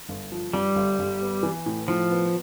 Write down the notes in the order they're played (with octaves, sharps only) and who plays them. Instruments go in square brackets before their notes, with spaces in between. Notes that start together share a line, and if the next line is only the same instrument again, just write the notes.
[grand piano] G1
F3
[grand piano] G2 [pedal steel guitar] G3
[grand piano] G1
G1
B3
E3
A2
[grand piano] A2 [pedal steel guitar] F3
[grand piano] B3